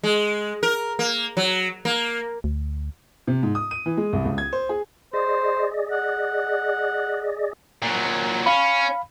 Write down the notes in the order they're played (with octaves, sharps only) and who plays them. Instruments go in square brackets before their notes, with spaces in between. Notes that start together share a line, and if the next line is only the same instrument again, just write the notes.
[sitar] G#3
A#4
A#3
F#3
A#3
[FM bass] D2
[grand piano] C3
G#2
D#6
D#7
E3
G#3
C2
C#2
G#6
C5
G#4
[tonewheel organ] G#4 D5 D#5 [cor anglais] C5
[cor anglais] F#5
[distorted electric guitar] A#2 F#3
[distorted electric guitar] C#4 [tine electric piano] F5 B5